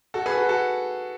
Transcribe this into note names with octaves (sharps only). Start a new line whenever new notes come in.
F#4 A4
G#4 B4
F#4 A4
F#4 A4